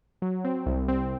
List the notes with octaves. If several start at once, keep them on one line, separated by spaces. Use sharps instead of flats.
F#3
C4
C2
C4